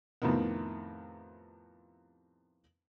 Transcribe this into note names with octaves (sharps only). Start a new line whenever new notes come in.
F2 A2 C3 D#3 B3